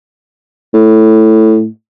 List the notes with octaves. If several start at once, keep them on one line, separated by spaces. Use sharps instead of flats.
A2